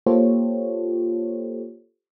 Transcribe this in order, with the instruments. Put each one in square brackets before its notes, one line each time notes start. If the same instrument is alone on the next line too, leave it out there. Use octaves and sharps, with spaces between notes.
[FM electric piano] A#3 F4 G4 A4 C5 C#5